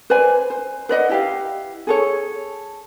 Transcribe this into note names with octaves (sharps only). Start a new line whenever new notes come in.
B4 C5 D5 G#5
C5
B4 D5 D#5 F#5
E4 G4 F5
G#4 A4 C#5